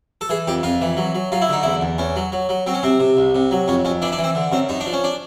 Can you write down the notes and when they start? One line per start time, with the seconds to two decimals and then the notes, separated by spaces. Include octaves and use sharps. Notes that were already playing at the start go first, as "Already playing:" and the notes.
0.21 A4
0.29 E3 G#4
0.48 F2 G4
0.63 F2 F4
0.81 E3
0.97 F#3
1.15 F#3
1.32 F#3 F4
1.41 E4
1.49 D3 D#4
1.63 E2 E4
1.81 E2
1.98 E2 C#4
2.16 F#3
2.32 F#3
2.49 F#3
2.67 F#3 C4
2.74 C#4
2.83 C3 C4
3.00 C3
3.17 C2
3.35 C3
3.51 F#3
3.68 F2 C#4
3.85 F2 C#4
4.02 E3 D4
4.12 D4
4.18 E3
4.24 C4
4.35 D3
4.52 F#2 C4
4.69 F#2 D#4
4.80 D4
4.86 F3
4.93 C#4
5.04 D4